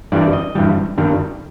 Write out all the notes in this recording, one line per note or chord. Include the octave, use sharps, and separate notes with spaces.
G2 E3 G3 D5
D#5
G2 E3 G3
G2 D#3 G3